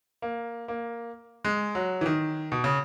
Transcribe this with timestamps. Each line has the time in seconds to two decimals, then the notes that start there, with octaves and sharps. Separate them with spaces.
0.22 A#3
0.68 A#3
1.45 G#3
1.75 F#3
2.01 E3
2.06 D#3
2.52 B2
2.64 C#3